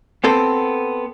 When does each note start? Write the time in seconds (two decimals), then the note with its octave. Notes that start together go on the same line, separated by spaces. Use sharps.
0.24 B3 C4 A4